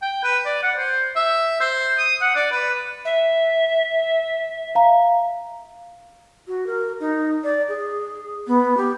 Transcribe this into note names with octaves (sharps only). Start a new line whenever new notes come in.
G5
B4
D5
F#5
C5
E5
C5
D#6
F#5
D5
B4
E5
F5 A#5
F#4
A#4
D#4
D5
G#4
B3
G4